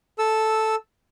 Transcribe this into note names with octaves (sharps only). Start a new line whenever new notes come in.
A4 E6